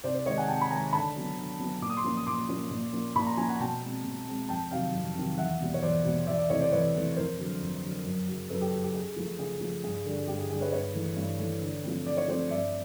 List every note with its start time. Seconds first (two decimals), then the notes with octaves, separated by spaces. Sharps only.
0.04 C3 C5 D5
0.14 C5 D5
0.26 D#3 G#3 C#5 D#5
0.38 F#5 G#5
0.48 C3 G5 A5
0.61 B5
0.70 D#3 G#3 G#5 A#5
0.93 D3 A5 B5
1.16 F#3 B3
1.38 D3
1.60 F#3 B3
1.82 A#2 D6
1.89 D#6
1.97 C6 D6
2.04 F3 A#3 C#4
2.17 D#6
2.26 A#2 C6 D6
2.49 F3 A#3 C#4
2.71 A#2
2.93 F3 A#3 C#4
3.15 A#2 B5 C#6
3.27 A#5 C6
3.37 F3 A#3 C#4 G#5 A#5
3.48 F#5 G#5
3.60 B2 G5 A5
3.82 G#3 C4
4.05 B2
4.27 G#3 C4
4.49 F2 G5 A5
4.71 C3 D#3 F#3 F5 G5
4.93 F2
5.16 C3 D#3 F#3
5.38 E2 E5 F#5
5.60 B2 G3 B3
5.74 C#5
5.82 E2 C5 D5
6.04 B2 G3 B3
6.27 E2 D5 E5
6.38 D5 E5
6.49 C3 E3 A3 C#5 D#5
6.61 C5 D5
6.71 E2 B4 C#5
6.94 C3 E3 A3
7.16 F2 A#4 C5
7.38 D3 F#3
7.61 F2
7.83 D3 F#3
8.06 F#2
8.28 C#3 F#3
8.50 F#2 A4 B4
8.61 G4 A4
8.72 C#3 F#3
8.83 G4
8.94 C#3 G#4
9.16 F3 A3
9.39 C#3 G#4
9.61 F3 A3
9.84 G2 G#4
10.06 D3 G3
10.18 G#4
10.27 G2 G4
10.39 G#4
10.50 D3 G#4
10.54 G3
10.61 B4 C#5
10.72 G2 B4 C#5
10.94 E3 A3
11.16 G2
11.39 E3 A3
11.61 D3
11.83 F3 A3 C4
12.06 D3 D5
12.17 C#5
12.28 F3 A3 C4 C5 D5
12.50 G2 D5 E5